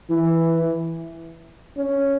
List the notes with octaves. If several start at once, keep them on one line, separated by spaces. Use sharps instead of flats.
E3
C#4